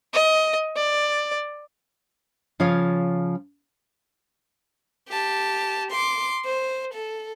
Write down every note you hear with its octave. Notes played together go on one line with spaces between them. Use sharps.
D#5
D5
C#3 F3 F4 C#5 F5
G4 A5
C6 D6
C5
A4